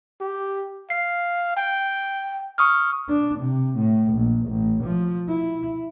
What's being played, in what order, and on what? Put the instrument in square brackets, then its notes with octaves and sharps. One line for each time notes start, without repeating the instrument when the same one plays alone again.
[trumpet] G4
[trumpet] F5 [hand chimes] C7
[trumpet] G5
[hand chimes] C#6 D#6 F6
[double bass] D4
C3
A2
A#1
A1
F3
E4